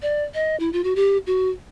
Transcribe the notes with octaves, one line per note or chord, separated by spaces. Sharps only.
D5
D#5
E4
F4
F#4
G4
F#4